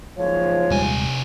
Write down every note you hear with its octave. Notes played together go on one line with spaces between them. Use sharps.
F#1 G#2 F3 C#5
D#1 C2 G3 G#3 G#5